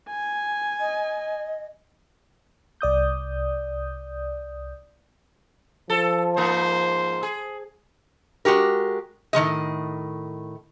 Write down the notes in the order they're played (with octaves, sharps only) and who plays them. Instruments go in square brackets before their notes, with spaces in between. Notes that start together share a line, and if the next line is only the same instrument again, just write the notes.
[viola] G#5
[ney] D#5
[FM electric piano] C2 D5 D#6 G6
[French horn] F3 [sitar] A4
[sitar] G#2 A#3 [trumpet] C5
[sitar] G#4
[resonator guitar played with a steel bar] G#3 F#4 G4 A#4
A2 D#3 G#3 D#5